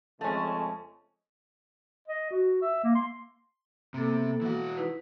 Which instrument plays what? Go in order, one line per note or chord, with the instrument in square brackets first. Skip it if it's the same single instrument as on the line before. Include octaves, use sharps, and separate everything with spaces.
[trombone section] F2 C#3 G#3 [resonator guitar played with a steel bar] A3 C#4 [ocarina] A5
[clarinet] D#5
F#4
E5
A#3
C6
[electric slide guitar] C3 [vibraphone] A#3 B3 A4
[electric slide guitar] E3 F#4
[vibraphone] D#4 E4 B4